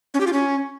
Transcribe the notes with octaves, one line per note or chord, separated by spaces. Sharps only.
C#4
G4
F4
C#4